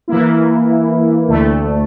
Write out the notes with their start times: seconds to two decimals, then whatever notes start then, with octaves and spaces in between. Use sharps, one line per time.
0.08 E3 A#3 E4
1.28 D2 D3 A3